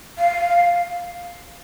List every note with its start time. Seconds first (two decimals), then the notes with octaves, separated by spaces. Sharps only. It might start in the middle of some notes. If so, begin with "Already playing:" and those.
0.18 F5